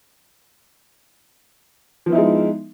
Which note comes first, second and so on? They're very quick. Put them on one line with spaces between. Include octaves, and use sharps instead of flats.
F3 B3 E4 D#4 G#3